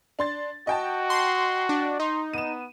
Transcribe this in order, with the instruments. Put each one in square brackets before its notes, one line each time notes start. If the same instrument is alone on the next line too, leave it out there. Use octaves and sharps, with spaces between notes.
[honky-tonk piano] D4 C6 A6
[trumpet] F#4 [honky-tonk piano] D#5 G5 A5
[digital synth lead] C6
D4
[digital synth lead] D#4 [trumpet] C6
[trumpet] B3 [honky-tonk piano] D#7 E7